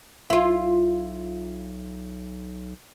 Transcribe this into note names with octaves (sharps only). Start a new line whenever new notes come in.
B1 E4 F4